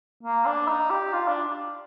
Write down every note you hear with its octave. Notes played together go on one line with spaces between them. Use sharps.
A#3
D4
D#4
G4
F4
D4